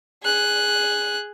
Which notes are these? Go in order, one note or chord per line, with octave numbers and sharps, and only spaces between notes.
G#4 F#6